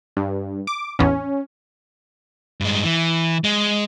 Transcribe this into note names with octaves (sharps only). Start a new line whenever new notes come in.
G2
D6
A1 E2 C#4
G2 G#3
E3
G#3